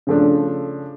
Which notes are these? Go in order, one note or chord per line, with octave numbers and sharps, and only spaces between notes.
C#3 F3 A3 D4